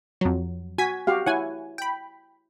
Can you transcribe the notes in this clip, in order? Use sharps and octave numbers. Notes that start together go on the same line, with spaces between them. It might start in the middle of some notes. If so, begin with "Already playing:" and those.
F2 F#3
F#4 G#5 G#6 B6
F#4 G4 F5
E4 C#5 F#5 G#5
G5 B5